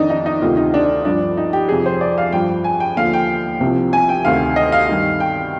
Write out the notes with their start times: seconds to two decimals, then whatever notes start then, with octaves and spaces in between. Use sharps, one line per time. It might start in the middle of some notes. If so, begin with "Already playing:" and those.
Already playing: F2 D#3 D4 D#4
0.10 D#4
0.26 D#4
0.41 D2 C3 D#3 F4
0.57 D#4
0.74 D4
1.05 G2 F3 D4
1.37 D#4
1.53 G4
1.69 F2 C3 F3 G#4
1.86 C5
2.01 D5
2.18 F5
2.32 G2 F3 G5
2.64 G#5
2.80 G5
2.96 D#2 D3 F3 F5
3.13 G5
3.60 C2 C3 F3
3.93 G#5
4.09 G5
4.25 D2 C3 D#3 F5
4.56 D#5
4.72 F5
4.89 G2 D#3
5.20 G5